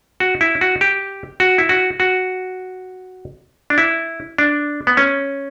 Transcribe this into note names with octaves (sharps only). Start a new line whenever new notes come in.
F#4
E4
F#4
G4
F#4
E4
F#4
F#4
D4
E4
D4
B3
C#4